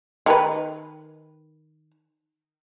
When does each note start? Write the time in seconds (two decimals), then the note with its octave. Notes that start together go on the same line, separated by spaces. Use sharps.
0.26 D#3 A#4 B4